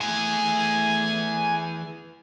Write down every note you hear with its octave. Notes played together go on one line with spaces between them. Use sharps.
E3 A3 G#4 G#5